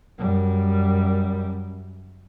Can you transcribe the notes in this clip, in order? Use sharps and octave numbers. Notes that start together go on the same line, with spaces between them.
F#2 G3